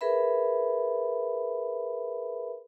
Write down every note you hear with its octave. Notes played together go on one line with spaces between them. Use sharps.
G#4 A#4 B4 E5 B5